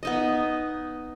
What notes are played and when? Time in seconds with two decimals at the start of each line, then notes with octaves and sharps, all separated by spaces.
0.03 B3 D#4 D#5